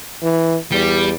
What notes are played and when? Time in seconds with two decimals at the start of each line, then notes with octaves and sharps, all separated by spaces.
0.23 E3
0.72 E2 G3